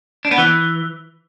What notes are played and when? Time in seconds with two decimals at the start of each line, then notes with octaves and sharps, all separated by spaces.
0.25 D4
0.31 B3
0.38 E3